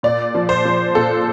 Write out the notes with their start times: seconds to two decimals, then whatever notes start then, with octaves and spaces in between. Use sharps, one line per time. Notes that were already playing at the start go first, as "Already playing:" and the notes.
0.03 A#2 D5
0.35 F3
0.49 C5
0.65 F3
0.95 A#2 A4